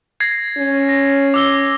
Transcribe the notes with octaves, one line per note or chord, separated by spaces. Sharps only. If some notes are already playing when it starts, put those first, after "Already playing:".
G#6 A#6 C7
C#4
A#6
D6 E6 G7